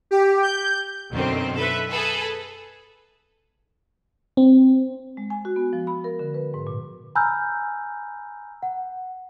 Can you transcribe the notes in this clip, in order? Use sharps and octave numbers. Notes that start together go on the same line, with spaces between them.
G4
G6
F#2 B2 D3 D#3 C4
A4 B4 E5
G#4 A4 B4 G#5
C4
G#3
G#5
F#4
B3
F3
B5
A#4
D3
B4
G#2
A#2
G#5 A#5 B5 E6 F6 G6
F#5